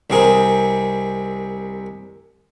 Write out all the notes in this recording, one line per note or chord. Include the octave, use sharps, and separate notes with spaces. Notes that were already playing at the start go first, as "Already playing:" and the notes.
C2 C3 C4 G#4 A#4 D#5